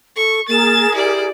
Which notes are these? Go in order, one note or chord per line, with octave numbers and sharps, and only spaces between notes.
A4 C#6
A#3 G#4 A#4 A6 E7
E4 G4 D5